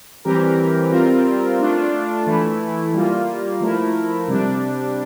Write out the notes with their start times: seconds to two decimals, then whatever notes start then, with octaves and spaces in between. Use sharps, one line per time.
0.25 E3 G3 C4 G4 A#4
0.92 G3 C4 F4 A#4
1.59 A3 D4 F4
2.27 E3 A3 E4
2.93 G3 A#3 F4
3.61 F3 A3 E4 A#4
4.28 C3 G3 D4